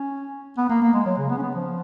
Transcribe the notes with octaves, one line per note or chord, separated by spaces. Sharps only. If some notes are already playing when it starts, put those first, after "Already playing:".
Already playing: C#4
B3
A#3
A#3
G#3
F#3
C#3
B3
C#4
B3
F3